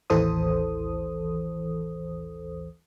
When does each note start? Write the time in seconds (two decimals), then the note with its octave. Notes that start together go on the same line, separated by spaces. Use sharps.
0.10 A1 D#2 E3 A4 C5 D#6